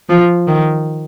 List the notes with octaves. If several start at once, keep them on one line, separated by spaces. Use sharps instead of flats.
F3
D#3